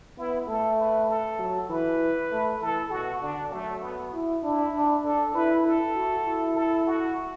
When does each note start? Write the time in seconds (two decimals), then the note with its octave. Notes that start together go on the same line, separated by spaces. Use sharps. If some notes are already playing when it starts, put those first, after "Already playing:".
0.18 B3 E4
0.48 A3 A4
0.79 B4
1.10 A4
1.39 F#3
1.69 E3 B4
2.31 A3
2.61 E3 A4
2.91 B2 F#4
3.22 D3 D4
3.52 F#3 A3
3.82 B3
4.13 E4
4.43 D4 E4
4.74 D4
5.04 D4 A4
5.34 E4 B4
5.65 A4
5.95 F#4
6.26 E4
6.56 A4
6.87 F#4